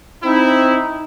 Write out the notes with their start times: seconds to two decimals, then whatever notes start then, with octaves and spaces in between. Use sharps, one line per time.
0.23 C4 D#4 E4